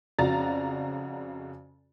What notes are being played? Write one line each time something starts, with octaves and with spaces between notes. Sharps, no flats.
F2 C#3 F#4 D5 A#5 A6